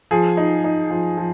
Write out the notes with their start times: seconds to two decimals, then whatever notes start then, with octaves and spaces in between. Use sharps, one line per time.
0.11 F3 G#4
0.37 D#4
0.64 D#4
0.91 F3
1.18 F3